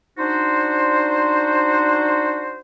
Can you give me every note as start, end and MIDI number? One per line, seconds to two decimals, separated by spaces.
0.18 2.58 62
0.18 2.58 63
0.18 2.58 66
0.18 2.58 72